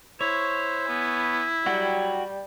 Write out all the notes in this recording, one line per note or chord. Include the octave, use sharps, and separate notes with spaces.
E4 C5 C#5
B3 G#5
F#3 G3 F#4 F#5 G5